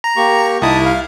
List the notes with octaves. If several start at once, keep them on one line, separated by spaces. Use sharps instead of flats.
A#5
A#3 G4 C#6
C2 D#4 E4 A5 D#6
F5